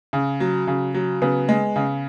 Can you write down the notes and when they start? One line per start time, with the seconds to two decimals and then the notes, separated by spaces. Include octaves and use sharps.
0.13 C#3
0.40 F#3
0.67 C#3
0.95 F#3
1.22 C#3 B3
1.49 G#3
1.76 C#3